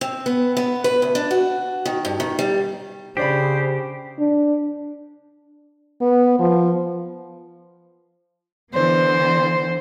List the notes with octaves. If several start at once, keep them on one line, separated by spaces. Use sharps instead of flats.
C4
B3
B3
B4
D2
D4
F#4
D#3
G2
D#3
G3
C#3 D4 G4 C5 D5 B5
D4
B3
F3
D3 E3 B3 C5